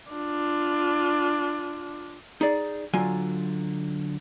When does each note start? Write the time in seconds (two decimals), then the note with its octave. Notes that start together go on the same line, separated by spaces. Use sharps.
0.12 D4 F4
2.41 D#4 G#4 D5
2.94 D3 F#3 F4 G#5